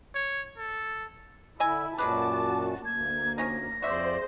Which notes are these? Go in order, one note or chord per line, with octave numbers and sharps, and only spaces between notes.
C#5
A4
D3 E4 D#5 G#5 E6
F#2 A#2 F#3 G#3 F#4 B4 A5 D6
D2 A#3 G#6
F3 C#4 D#4 A#6
F2 F#4 G#4 C5 D5 E5